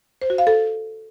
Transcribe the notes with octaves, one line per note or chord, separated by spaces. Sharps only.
C5
F#4
F5
A4